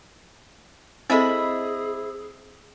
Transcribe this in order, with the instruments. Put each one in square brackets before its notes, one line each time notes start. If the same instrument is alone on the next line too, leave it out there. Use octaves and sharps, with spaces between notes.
[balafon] C4 A4 [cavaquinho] E4 D#5 B5 [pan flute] G#4 [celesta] C5 E6